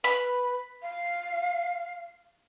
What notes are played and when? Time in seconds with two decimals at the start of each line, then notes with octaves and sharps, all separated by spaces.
0.04 B4 B5
0.82 F5